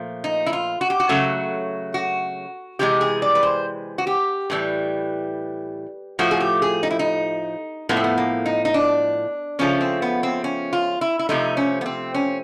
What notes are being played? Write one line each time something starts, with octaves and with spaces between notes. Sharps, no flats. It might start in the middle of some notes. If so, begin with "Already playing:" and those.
Already playing: A#2 F3 A3
D#4
E4
F4
F#4
G4
F#4
C#3 F#3 A3
F#4
C3 E3 G#3 G4
G#4
D5
B4
C5
F#4
G4
A2 E3 G3
A2 F3 A3 F#4
G#4
G4
G#4
D#4
E4
D#4
A2 F3 A3 B3
C4
B3
A#3
D#4
D#4
D4
C#3 F3 A3 C#4
C4
B3
C4
C#4
F4
E4
E4
C3 F3 A3 D#4
C#4
B3
C4
C#4